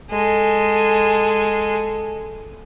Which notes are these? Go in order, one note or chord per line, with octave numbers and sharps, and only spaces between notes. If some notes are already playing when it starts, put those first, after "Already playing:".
G#3 A4